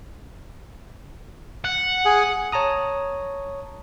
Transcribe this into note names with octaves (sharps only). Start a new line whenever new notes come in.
F#5
G#4
C#5 A5 A#5 D#6